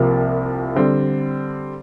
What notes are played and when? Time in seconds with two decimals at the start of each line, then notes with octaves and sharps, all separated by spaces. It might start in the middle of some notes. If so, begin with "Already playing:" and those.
Already playing: C2 C3 F3 A#3
0.75 D3 G3 C4